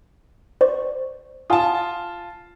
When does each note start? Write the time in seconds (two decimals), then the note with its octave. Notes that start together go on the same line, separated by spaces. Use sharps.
0.61 C5 D5 C#6
1.50 F4 F#5 G#5 A5 D#6